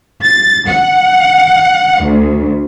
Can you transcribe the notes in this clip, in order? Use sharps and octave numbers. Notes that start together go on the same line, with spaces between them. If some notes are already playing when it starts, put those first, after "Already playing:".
A6
F#5
D2